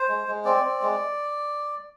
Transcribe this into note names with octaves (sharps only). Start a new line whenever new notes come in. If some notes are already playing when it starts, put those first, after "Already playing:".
Already playing: C5
G#3
G#3
C4 D5
C4
G#3